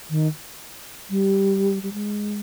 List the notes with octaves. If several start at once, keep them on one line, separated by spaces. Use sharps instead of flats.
D#3
G3
G3
G#3